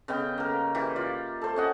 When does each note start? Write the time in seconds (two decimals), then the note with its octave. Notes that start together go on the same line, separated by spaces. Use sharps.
0.08 C#3 B3 D#5 G5
0.38 A#3 A#4
0.75 E3 G4
0.96 F4 D5
1.41 A4 C5
1.56 C#4 D#5 F#5